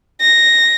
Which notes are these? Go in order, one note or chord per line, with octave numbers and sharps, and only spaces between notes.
A#6